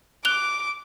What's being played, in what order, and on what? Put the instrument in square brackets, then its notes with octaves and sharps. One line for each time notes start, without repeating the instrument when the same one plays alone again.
[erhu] D6 [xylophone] F#6 F7 G7